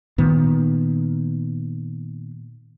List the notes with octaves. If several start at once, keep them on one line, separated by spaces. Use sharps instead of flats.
A#2 D#3 B3